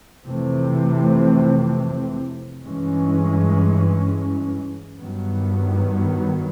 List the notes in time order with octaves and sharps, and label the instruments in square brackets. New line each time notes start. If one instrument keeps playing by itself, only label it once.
[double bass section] F2 C3 E3 A3 C4
G2 E3 G#3 C#4
G2 D#3 F#3 B3